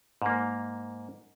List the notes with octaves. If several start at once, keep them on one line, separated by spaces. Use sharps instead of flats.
G#2 A#3